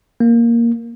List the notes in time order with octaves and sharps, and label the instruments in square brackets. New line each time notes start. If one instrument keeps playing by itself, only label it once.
[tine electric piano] A#3